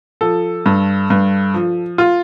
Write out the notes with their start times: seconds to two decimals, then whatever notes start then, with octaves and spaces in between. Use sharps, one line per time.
0.21 F3 A4
0.66 G2
1.10 G2
1.54 F3
1.98 F4